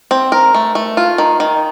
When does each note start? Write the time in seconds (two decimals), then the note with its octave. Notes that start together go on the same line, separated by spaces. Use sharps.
0.11 C4
0.32 A#4
0.54 A3
0.75 A3
0.97 F4
1.18 D#3
1.40 D#3